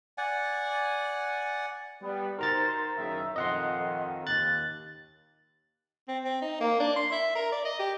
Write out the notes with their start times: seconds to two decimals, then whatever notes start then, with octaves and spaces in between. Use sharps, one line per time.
0.18 D5 F#5 G#5
2.02 G3 B3
2.39 D#4 F#4 A#4 C5 A#5 A6
2.97 F#1 D#3 E5
3.36 F2 D#3 D#5 F#5 C6
4.27 D#2 F#6 A6
6.08 C4
6.25 C4
6.42 D#4
6.60 A#3
6.80 D4
6.96 C6
7.12 E5
7.35 A#4
7.52 D5
7.65 D#5
7.79 G4